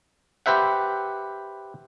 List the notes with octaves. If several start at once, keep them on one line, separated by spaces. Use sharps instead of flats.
G4 B4 C5 E5 F#5